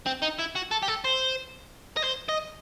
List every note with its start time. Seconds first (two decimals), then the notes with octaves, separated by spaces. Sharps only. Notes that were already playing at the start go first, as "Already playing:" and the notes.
0.06 C4
0.22 D#4
0.39 E4
0.55 F#4
0.71 A4
0.82 G4
0.88 A4
1.05 C5
1.97 D#5
2.04 C5
2.29 D#5